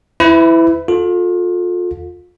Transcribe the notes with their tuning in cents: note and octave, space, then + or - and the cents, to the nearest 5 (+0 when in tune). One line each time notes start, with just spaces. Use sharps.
E4 +0 B4 +35
F4 +30 A4 +0